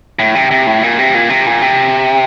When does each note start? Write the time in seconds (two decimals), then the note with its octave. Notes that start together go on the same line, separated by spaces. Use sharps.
0.19 A2
0.35 C3
0.51 C3
0.67 A2
0.83 A#2
0.99 C3
1.15 A#2
1.30 C3
1.47 A#2
1.62 C3